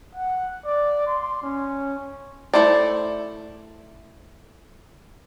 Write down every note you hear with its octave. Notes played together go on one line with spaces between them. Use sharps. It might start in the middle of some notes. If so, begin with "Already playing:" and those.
F#5
D5
C6
C#4
A3 C4 E4 C5 D5